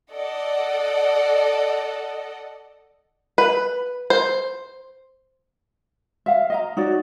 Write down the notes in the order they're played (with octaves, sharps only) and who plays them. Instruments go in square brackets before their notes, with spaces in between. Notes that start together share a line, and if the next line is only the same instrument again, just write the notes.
[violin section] A4 D5 D#5 F#5
[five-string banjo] B4
C5
[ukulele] E5 F5
D#5 F5 A#5
D#4 F#4 C#5 D5